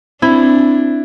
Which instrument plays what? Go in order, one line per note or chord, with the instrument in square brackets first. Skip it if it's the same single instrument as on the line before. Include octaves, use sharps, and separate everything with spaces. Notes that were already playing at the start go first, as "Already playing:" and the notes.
[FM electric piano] C4 [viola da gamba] D4 [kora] E4